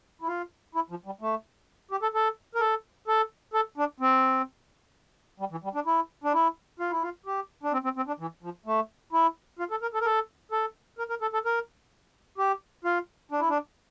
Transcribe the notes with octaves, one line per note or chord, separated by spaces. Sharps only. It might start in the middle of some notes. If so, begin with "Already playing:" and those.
E4
F4
E4
F3
G3
A3
G4
A4
A4
A#4
A4
A4
A4
D4
C4
G3
E3
G3
D4
E4
D4
E4
F4
E4
F4
G4
D4
C4
C4
C4
D4
E3
F3
A3
E4
F4
A4
A#4
A4
A#4
A4
A4
A#4
A#4
A4
A4
A#4
G4
F4
D4
E4
D4